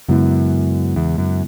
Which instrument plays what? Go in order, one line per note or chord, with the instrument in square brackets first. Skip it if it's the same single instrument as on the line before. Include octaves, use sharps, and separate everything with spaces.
[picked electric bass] F#2 [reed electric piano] C#3 G#3 B3 E4
[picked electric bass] E2
F#2